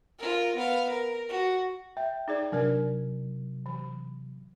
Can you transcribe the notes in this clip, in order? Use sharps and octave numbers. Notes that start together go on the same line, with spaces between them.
F4 A#4
B3 F5
A#4
F#4
E5 G5
D#4 G#4 D5
C3 F#3 D4 A#4 D5
E3